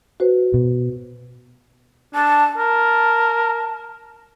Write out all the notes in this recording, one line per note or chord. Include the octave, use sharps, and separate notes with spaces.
F#4 B4 C5
B2
D4 A5
A#4 A5